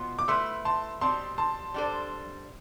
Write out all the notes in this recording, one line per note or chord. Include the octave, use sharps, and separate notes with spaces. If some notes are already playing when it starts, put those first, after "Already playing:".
Already playing: B2 B3 F4 C5
D6
A3 E4 B4 C6 E6
A5 C6
B2 G3 C4 A5 C6
A5 C6
G3 D4 A4 C5